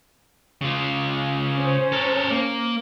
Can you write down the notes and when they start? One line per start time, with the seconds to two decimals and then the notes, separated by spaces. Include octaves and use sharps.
0.61 C#3 F4
1.57 C#4 C5
1.92 A4 A#4
2.31 A#3